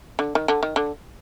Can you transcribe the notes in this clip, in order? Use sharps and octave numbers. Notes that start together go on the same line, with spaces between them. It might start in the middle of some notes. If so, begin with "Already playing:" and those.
D3
D#3
D3
D#3
D3